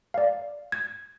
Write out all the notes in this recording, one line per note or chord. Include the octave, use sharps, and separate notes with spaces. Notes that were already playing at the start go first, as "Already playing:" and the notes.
D5 F5
G#6